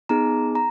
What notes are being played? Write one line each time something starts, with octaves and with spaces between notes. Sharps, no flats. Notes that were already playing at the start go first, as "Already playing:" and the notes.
B3 D#4 G#4 A#5
A#5